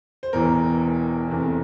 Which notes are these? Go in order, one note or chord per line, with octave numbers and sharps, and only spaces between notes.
C5
E1 E2 E3 A#4
F1 E2 C3 E3